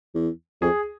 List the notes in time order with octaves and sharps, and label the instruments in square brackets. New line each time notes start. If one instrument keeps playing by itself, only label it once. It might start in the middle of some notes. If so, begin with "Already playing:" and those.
[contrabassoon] E2
[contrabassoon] F2 [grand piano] G#4